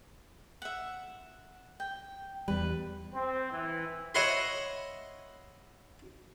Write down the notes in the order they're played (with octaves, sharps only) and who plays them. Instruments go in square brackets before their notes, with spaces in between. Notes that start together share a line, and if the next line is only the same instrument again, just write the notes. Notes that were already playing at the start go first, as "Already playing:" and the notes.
[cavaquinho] E5 F#5
G5
[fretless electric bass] E2 G3 [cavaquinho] B4
[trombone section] C4
E3
[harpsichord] C#5 D#5 E5 F#5 B5 C6